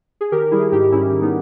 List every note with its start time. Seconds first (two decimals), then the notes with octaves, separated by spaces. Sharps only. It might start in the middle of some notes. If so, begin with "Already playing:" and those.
0.21 G#4
0.32 D#3 G4 A#4
0.51 G3 E4 G#4
0.72 G#2 D#4 G4
0.92 G#2 C#4 E4
1.12 D#3
1.22 B3 D#4